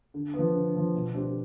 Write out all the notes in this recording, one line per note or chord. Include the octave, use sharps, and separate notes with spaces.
D3
B3
F3
D3
F3 B3
B2
A3 D4 G4 C5